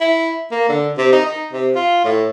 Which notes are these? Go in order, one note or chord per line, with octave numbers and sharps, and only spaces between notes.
E4
A#3
D3
C3
D#4
D#4
C3
F4
A2